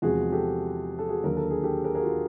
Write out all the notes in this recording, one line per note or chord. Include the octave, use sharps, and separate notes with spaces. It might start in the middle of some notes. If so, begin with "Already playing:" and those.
E2 C3 F3 G#3 F#4 G#4
G4 A4
A4
F#4 G#4
D#2 D3 F#3 A#4
A4
G#4
G4 A4
G#4 A#4
G#4 A#4
F#4
F4